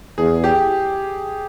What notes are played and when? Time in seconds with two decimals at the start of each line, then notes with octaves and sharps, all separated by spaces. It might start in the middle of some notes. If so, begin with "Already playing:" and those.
0.18 E2 G#4
0.44 G4